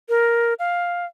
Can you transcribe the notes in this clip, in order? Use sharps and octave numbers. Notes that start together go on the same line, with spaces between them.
A#4
F5